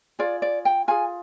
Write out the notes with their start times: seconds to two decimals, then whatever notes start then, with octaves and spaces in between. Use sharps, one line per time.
0.19 F4 G#4 D5
0.42 D5
0.65 G5
0.88 F4 G#4 G#5